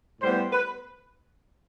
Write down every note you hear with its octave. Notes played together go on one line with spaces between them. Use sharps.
A2 G3 B3 C5
B4